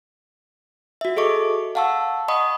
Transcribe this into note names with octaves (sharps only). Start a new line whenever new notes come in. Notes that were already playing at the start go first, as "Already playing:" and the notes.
F#4 E5
G#4 A4 D#5 C#6 D6
F5 F#5 A5 C#6 E6
D#5 F#5 B5 C#6 D#6